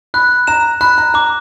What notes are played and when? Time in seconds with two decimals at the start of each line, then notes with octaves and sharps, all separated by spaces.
0.14 B5 F#6
0.47 A#5 E7
0.81 B5 F#6
0.98 A#5
1.14 A#5 D6